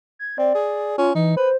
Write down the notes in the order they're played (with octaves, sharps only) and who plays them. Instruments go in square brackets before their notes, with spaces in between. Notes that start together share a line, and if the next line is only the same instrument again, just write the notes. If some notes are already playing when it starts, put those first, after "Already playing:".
[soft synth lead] G#6
[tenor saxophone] C4 [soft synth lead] D5
[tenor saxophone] G#4
[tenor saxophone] C#4 [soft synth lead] F4
[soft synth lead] E3 [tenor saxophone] D#4
[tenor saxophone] B4 [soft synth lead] C5